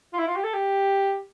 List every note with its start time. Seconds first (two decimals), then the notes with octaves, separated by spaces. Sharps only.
0.13 F4
0.18 E4
0.27 F4
0.36 G4
0.44 A4
0.53 G4